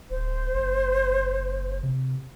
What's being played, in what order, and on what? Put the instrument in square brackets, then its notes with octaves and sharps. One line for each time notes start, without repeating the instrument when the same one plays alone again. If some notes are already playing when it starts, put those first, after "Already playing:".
[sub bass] D1 [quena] C5
[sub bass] F#1
C3